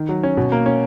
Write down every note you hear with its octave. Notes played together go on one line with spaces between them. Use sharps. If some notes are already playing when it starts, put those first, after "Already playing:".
Already playing: D#3
F#3
C#4
B2
A#3
C#4